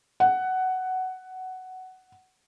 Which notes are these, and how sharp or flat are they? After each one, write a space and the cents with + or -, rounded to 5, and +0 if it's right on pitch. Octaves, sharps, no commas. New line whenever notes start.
F#5 +10